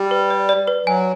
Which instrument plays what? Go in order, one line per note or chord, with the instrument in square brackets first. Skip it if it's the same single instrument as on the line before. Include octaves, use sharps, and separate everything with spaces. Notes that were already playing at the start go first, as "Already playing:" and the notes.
Already playing: [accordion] G3
[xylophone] B4
D5
D5
B4
[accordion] F#3 [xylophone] G#5